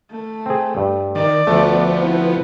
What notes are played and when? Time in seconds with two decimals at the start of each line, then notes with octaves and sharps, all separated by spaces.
0.11 A3
0.46 C4 G#4
0.77 G2
1.15 D#3 D5
1.47 D2 F3 A3 B3
1.99 C4 E4